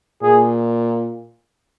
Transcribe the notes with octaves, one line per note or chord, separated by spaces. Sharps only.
A#2 G#4